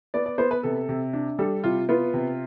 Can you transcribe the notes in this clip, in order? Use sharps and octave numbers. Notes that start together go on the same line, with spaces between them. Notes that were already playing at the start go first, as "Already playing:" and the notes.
B3 D5
D5
B3 C5
B4
C3 A4
C3
D4
G3 A4
C3 F4
B3 F4
C3